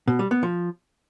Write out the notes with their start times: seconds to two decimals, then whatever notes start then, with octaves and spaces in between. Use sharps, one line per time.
0.08 B2
0.19 G3
0.31 B3
0.43 F3